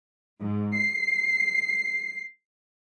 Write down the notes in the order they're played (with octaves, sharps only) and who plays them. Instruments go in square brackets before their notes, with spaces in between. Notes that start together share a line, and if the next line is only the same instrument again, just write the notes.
[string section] G#2
C7